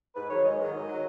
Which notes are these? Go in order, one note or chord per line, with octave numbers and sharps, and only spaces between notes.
G#2 B4
D#3 F#3 C#5
G#2 D#5
D#3 F#3
G#2
D#3 F#3